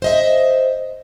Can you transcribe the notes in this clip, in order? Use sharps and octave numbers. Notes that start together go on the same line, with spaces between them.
C5 D#5 E5